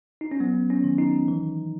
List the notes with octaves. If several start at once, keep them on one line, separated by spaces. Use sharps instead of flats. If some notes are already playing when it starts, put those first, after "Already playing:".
D#4
C#4
F#3 B3
C#4
D#3
D#4
E3